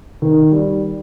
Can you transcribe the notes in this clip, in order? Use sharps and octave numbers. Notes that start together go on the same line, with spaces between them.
D#3
G3